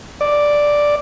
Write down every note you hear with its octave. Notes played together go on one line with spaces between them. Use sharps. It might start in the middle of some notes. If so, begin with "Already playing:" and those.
D5